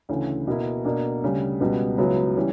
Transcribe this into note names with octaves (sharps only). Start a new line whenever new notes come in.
D2 C#3 E3
B2 A#3 E4
B2 A#3 D4
D2 C#3 G3
C#2 B2 G3 B3
C#2 C#3 F#3 B3 E4
E3 G3 C#4